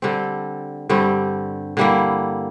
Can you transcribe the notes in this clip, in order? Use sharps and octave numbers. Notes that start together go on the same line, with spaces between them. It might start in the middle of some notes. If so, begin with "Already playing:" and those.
D3 G3 C4
G2 D3 G3 C4
D3 G3 A#3 E4